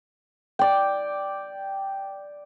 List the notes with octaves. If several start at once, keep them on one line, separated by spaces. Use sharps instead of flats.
D5 G5